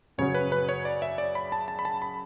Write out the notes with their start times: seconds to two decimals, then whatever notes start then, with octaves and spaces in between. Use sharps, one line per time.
0.18 F#2 C#3 F#3 C#4 C#5
0.35 B4
0.52 B4
0.69 C#5
0.85 D5
1.02 E5
1.18 D5
1.35 B5
1.52 A5
1.68 A5
1.79 B5
1.85 A5
2.02 B5